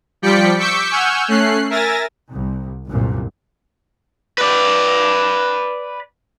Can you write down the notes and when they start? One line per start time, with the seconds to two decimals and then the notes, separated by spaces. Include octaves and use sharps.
0.22 F3 G3 D5 G5 B6 C#7
0.58 C#6 D6 E6 G6 B6 C#7
0.91 F#5 G#5 C#6 E6 F6 G6
1.28 A3 C#4 F#6 C7
1.70 A#4 E5 G#5 A6 A#6
2.31 C2
2.88 G1 C2 F#2 A#2
4.38 B4 D5